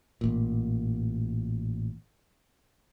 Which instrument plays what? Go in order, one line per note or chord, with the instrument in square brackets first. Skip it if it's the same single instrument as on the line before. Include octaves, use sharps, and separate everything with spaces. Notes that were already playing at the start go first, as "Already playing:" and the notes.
[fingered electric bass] A1 A#2